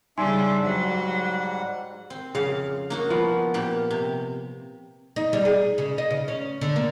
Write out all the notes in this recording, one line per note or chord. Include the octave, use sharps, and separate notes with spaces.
C#3 G3 D4 D#4 E5 G#5 C6
G#2 F#3 G3 F#5
C4
F2 C#3 F5
A#3 D#4 F#4
F3 B3 F4
A#2 A#3 G4
C3
D#4
G3
G#4
C#3
D#5
C#3
C#4
D3
A#3